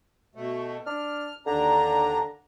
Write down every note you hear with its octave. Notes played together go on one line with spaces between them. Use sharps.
B2 A3
D4 F6
D#2 D3 D4 A#5